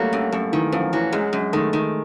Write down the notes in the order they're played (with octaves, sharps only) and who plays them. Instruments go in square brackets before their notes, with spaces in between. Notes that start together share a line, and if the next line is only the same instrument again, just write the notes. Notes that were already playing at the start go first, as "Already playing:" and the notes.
Already playing: [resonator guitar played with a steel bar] F#3 [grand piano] G3 A3 A#3
[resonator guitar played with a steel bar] F#2
[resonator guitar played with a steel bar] F#2 [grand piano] A3
[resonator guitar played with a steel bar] D#3 [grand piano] E3
[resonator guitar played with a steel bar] F#2 [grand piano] F3
[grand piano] E3 [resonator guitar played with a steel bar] F#3
[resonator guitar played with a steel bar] F#2 [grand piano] G#3
[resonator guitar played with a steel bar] F#2
[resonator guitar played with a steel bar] D#3 [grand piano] A3
[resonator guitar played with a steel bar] D#3